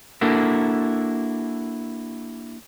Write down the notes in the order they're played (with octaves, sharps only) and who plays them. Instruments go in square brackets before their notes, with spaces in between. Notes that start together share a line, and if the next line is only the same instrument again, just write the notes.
[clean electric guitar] A#3 D4 E4 F#4 A4 A#4